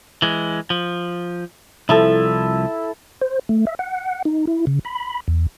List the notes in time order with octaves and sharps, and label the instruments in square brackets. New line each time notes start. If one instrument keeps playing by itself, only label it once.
[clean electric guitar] E3 G#3
F3
[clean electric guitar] C2 F3 [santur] E4 A4
[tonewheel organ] C5
A3
E5
F#5
D#4
E4
C#3
B5
E2